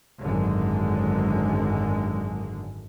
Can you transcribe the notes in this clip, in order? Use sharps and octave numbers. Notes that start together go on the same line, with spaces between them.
G#1 F#2 D3 G#3